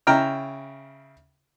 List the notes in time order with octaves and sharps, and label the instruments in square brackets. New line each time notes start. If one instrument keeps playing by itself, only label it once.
[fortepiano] C#3 E4 G5 A#5 F6